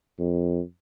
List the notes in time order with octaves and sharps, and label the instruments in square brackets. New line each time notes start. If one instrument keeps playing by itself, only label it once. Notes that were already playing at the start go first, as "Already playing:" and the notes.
[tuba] F2